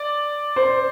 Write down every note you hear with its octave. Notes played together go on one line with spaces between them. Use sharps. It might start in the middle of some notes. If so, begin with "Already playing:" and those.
Already playing: D5
C5